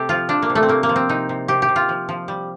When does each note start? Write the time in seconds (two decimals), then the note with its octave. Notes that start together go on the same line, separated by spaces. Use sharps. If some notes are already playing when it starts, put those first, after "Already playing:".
Already playing: C3 A3 G4 A4
0.09 F3 F4
0.29 F3 D4
0.42 A#3
0.50 C3
0.55 A3
0.63 C4
0.68 C3 A#3
0.83 A#3
0.89 F3
0.96 C4
1.09 C3 D#4
1.29 C3
1.48 C3 G4
1.62 G4
1.69 C3
1.76 F4
1.89 F3
2.09 F3
2.28 G3